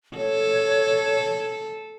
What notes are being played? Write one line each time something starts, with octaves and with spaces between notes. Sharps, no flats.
A4 C#5